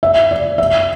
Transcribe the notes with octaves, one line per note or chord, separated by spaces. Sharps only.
E5
D5
E5